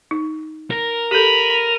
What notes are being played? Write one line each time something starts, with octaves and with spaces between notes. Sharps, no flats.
D#4
A#4
G4 A4 B5 D#7 F7